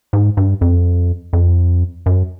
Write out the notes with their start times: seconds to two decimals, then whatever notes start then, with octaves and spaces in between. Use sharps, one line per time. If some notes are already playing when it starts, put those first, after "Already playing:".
0.13 G#2
0.37 G2
0.61 F2
1.33 F2
2.06 F#2